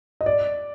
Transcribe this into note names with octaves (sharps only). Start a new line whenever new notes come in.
D#5
D5